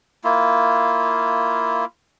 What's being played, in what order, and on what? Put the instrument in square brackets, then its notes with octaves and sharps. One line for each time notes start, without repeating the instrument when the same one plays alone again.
[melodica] A#3 E4 F4